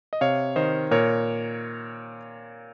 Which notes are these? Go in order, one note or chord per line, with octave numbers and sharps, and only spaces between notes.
D#5
C3 C#5 F5
D#3 C5 D#5
A#2 A#4 C#5